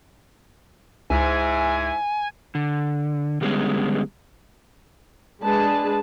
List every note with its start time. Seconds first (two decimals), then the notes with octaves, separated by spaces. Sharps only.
1.10 C#2 G#2 E4 G#5
2.55 D3
3.41 D3 G3 G#3 B3 C#4
5.44 G#3 D4 G#4 B4 A5